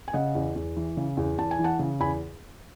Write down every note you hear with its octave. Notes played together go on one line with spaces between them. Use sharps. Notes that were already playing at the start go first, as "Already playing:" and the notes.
G#5
C#3 D#5 F#5
E2
E2
E3
C#3
E2
E2 A5
G#5
E3
F#5 A5
C#3
E2 G#5 B5